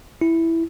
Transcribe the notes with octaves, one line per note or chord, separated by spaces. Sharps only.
E4